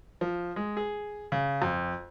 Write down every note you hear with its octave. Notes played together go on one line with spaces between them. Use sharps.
F3
G#3
G#4
C#3
F2